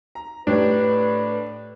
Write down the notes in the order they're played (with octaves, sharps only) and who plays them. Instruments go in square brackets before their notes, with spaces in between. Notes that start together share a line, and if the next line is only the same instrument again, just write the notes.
[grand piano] A#5
[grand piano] A2 G4 C#5 [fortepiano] D4 [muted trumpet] B4